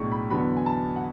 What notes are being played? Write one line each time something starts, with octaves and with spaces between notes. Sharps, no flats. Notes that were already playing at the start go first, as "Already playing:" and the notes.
Already playing: B1 A2 G#3 D4 C#6
B5
E2 D3 F#3 B3 B5
G#5
A5
F#5